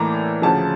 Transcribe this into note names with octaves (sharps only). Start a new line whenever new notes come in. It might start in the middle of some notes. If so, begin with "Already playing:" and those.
Already playing: A2 E3 A#3 D5 A#5
D2 C#3 F3 A5